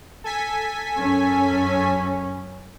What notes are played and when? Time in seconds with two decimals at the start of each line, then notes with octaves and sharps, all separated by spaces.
0.24 A4 G#5 B6
0.97 F#2 C#4